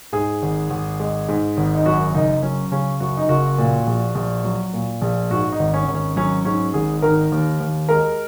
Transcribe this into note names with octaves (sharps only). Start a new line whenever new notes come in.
G#2 G#4
G#1
G#1
G#3
G#2
G#1
D#4
F#2 F#4
F#1 D#4
F#3 C#4
C#3 C#4
F#2 F#4
D#4
F#1 F#4
A#2
A#1
A#1
F#3
A#2
A#1
G#2 F#4
D#4
G#1
C#4
G#1
C#4
F#3 C#4
G#2 C#4
G#1 G#4
D#3 A#4
D#2
D#2
G#3 A#4